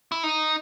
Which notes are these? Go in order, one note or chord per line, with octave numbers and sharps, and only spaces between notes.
E4
D#4